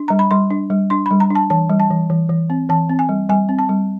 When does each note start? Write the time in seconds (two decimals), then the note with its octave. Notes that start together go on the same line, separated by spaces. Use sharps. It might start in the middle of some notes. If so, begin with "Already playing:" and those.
Already playing: D4
0.08 G3 A#5
0.19 B5
0.31 G3 C6
0.51 D4
0.70 G3
0.90 D4 C6
1.06 G3 B5
1.20 A#5
1.30 D4
1.35 A5
1.50 E3 A5
1.69 G3
1.80 A5
1.91 E3
2.10 E3
2.29 E3
2.50 C4
2.69 E3 A5
2.89 C4
2.99 G#5
3.09 G3
3.29 G3 G#5
3.49 C4
3.59 A5
3.69 G3